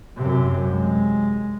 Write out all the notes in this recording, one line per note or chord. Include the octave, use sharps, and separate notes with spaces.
F#2 C3
G#3